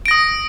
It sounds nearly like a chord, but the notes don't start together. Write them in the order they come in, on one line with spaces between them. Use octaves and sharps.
D7 A#6 D#6